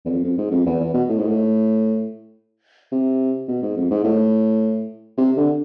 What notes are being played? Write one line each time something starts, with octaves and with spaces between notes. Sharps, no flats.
E2
F2
F2
G#2
F2
E2
E2
B2
A2
G#2
A2
C3
B2
G#2
F2
G#2
A2
C3
D3